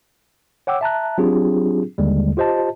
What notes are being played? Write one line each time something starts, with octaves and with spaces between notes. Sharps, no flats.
C#5 F#5 G5 D6 E6
E5 A5 A#5 F#6
F#3 C4 D4 F4 G4 G#4
D#2 D3 G3 G#3
F4 G4 C5 D#5 A5